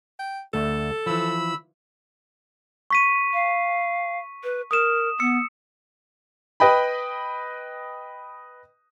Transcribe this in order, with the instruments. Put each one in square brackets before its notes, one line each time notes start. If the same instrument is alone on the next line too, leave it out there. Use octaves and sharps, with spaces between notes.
[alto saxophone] G5
[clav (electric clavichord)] D2 A3 E5 [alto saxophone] A4
[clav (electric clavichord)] E3 F3 [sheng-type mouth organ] B5 E6
[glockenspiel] C#6 B6 D#7
[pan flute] F5
B4
[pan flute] A#4 [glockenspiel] D#6 E7
[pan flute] B3 [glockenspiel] E6 C#7
[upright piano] B4 D#5 G5 B5